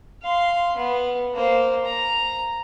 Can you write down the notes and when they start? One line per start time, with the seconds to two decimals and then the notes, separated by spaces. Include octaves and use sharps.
0.22 F5 C6
0.76 B3
1.34 A#3 C5
1.85 A#5